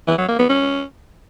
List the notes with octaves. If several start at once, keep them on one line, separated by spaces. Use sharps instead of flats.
E3
F#3
A#3
B3
C#4